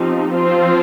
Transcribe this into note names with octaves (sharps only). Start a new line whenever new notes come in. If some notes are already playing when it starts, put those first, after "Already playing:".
Already playing: F3 C4 D#4 G4
F3 C4 F4 C5